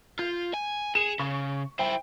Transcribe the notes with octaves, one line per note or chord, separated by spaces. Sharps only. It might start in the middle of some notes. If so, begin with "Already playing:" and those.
F4 G6
G#5
G#4 C#7 E7
C#3 C#6
E4 C5 G5